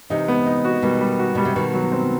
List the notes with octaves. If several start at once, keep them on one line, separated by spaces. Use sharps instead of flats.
C3 E3 D#4
B3
D#4
F#4
B2 D#3 G3
G3
F#4
B2 G3
C3
B2 D#3 F#4
F#3
C4